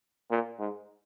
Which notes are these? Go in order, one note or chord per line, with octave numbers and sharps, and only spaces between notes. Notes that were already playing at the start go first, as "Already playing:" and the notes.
A#2
G#2